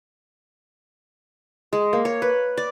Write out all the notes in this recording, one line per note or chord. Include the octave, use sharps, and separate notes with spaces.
G#3
A#3
C#5
B4
D5